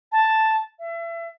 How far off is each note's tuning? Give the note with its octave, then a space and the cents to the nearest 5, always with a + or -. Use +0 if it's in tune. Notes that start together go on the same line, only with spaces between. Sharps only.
A5 +0
E5 +30